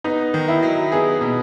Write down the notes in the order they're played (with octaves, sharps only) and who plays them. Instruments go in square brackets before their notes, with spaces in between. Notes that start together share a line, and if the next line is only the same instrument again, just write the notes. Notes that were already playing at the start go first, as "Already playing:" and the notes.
[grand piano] B3 [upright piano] D#4
[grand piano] D#3
[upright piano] E4
[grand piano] F#3
[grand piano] B3 [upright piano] G#4
[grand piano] B2